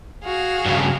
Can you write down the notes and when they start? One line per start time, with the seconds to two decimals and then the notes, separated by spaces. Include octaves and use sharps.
0.24 F#4 G#4 F5
0.66 G2 C#3